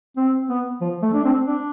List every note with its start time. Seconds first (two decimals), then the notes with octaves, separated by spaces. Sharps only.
0.17 C4
0.49 B3
0.81 F3
1.02 A3
1.14 D4
1.25 C4
1.46 D4